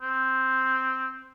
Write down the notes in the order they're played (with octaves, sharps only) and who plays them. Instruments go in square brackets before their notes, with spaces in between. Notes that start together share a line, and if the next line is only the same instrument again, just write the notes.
[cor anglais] C4